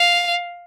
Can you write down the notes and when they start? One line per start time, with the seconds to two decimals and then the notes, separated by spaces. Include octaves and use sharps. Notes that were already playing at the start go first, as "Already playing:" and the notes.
Already playing: F5